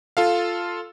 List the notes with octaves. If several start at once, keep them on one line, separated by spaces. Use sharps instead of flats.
F4 A4 F5